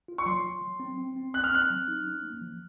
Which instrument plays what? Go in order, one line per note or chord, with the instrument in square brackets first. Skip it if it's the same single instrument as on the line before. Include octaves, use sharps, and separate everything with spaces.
[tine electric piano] F4
[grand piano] C#6
[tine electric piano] F#3 [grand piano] C6
[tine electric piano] F#3
F#3
C4
C4
C4
[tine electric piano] C4 [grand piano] F#6
[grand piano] F6
[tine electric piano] C4 [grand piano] F#6
[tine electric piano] F#3
D#4
C#4
A#3
F3